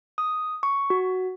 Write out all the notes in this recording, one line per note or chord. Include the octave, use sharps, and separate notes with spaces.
D#6
C#6
F#4